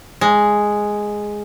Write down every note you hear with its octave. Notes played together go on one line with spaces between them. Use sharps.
G#3